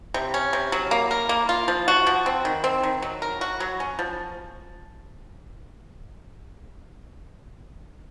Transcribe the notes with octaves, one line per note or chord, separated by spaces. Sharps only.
C3
C#4
C3
F#3
A#3
A#4
A#3
F4
F3
F#4
F3
C4
D#3
C4
D#3
F#3
A#4
F#4
F#3
C#4
F3